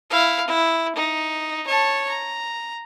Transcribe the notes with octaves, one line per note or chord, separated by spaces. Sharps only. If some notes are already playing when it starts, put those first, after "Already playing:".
E4 F5
E4
D#4
C#5 A5
A#5